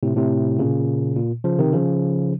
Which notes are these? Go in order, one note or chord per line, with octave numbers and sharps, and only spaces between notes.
A2 C3
A2 C3
A#2 C#3
A#2
C#3 F3
C3 D#3
C#3 F3